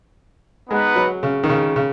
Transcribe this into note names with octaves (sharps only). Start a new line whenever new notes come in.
G#3 B3 D#4 B4 F#5
F#3
C#3
D#3
C#3
C#3